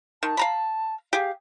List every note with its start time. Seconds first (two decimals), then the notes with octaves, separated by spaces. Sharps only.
0.23 D#3 A5
0.37 F5 A#5 B5
1.13 G4 G#4 F5